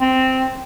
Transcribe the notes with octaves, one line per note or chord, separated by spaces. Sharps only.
C4